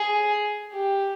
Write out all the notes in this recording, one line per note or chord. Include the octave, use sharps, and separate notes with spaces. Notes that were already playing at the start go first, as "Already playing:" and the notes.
Already playing: G#4
G4